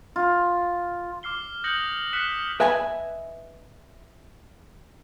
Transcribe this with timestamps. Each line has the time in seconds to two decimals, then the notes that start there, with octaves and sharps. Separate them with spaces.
0.16 F4
1.23 D6 F6 C7 G7
1.64 D#6 F#6 G6 A#6 C#7 F#7
2.13 F6 F#6 A#6 B6 C#7 E7
2.60 B4 D#5 E5 G#5 A5 B5